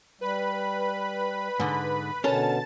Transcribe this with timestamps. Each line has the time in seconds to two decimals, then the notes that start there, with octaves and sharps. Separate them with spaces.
0.21 G3 B4 B5
1.60 G#2 D3
2.24 B2 D3 C#4 A4 A#4 A5 A6